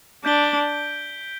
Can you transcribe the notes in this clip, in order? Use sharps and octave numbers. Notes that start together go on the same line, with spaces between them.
D4 G6 B6 D7 G7